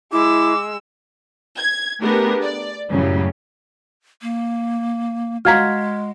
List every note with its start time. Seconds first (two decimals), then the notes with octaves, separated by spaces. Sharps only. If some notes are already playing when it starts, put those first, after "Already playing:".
0.12 G#3 E4 D6 E6
1.58 G#6
2.02 A3 B3 D4 G4 G#4 A#4
2.41 D5
2.91 F#2 A2 C#3 F#3 G3
4.22 A#3
5.45 G#3 F#4 F5 A#5 F6 G#6 B6